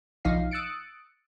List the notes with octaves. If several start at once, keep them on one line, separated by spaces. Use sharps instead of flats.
B1 F3 D#4 F5 C7
D#6 E6 F#6 A6 C#7 D7